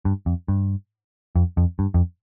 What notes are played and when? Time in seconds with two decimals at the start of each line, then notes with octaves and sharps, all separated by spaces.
0.05 G2
0.26 F2
0.48 G2
1.35 F2
1.57 F2
1.79 G2
1.94 F2